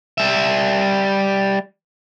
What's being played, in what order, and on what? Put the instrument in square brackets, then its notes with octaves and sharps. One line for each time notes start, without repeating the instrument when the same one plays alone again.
[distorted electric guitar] G3 E5